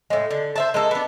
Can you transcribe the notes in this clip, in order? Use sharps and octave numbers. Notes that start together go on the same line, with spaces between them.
A2 G#3
D3
C5 E5 A5
G#3 A#3 A4
B3 D4